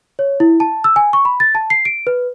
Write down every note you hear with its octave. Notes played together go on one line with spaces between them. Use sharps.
C#5
E4
A5
E6
G#5
C#6
B5
A6
A5
C7
D7
B4